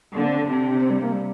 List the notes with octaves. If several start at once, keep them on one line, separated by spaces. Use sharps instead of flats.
D3 A#3
C4
D4
C3
C4
G3
A#3
G3